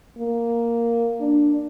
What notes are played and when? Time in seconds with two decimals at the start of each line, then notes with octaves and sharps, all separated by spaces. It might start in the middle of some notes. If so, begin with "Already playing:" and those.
0.18 A#3
1.20 D4